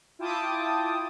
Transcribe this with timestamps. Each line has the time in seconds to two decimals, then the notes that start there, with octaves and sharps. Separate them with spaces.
0.19 E4 F4 G5 A5 D6 D#6